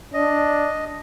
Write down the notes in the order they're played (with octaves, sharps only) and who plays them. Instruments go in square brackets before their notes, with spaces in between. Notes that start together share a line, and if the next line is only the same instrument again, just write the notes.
[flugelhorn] D4 [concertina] D#5